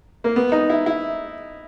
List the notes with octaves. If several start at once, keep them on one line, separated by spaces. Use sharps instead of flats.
A#3
B3
D#4
E4
E4